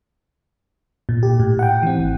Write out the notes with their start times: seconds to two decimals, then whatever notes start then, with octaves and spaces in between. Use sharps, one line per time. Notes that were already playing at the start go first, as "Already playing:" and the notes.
1.09 A#2
1.23 G4
1.40 A2
1.59 F#5 G5
1.83 E3 C4
1.99 G#1